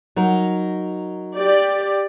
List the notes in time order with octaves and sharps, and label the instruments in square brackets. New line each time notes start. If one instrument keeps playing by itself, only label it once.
[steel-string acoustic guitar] F#3 D#4 A#4
[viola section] G4 D5